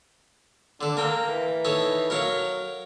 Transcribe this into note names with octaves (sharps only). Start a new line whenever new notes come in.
D3 D4 A4
A#3 A#4 G5
E3
D#4 A4 C#5
F#3 A#4 C#5 F5